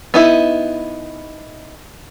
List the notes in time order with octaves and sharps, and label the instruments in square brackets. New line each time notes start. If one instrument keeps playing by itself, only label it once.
[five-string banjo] B3 D#4 E4